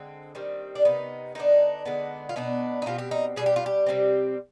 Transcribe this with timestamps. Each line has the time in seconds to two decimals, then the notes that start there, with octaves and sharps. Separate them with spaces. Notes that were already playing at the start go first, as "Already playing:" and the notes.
Already playing: D3 G#3 C4
0.35 D#3 G3 C4
0.75 D4
0.85 C3 D#3 B3 D#4
1.35 D3 G3 B3 D4 D#4
1.85 D3 G#3 B3 D4
2.29 F4
2.36 B2 B3 D4 D#4
2.82 D#4
2.86 B2 G3 C4 F4
2.98 G4
3.11 D#4
3.36 B2 G3 D4 G#4
3.46 G4
3.56 F4
3.66 G4
3.86 C3 G3 C4